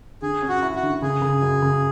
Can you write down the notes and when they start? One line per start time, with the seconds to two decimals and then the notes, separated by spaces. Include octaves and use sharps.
0.22 D3 G#4
0.42 C#4
0.49 F#4
0.63 E4
0.75 F#4
0.83 D3
1.02 C#3 G#4
1.22 C#3
1.42 F#2
1.62 C#3